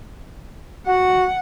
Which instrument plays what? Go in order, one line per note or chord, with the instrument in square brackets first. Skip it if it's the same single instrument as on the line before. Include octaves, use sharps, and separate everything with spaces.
[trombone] F#4 [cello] F#5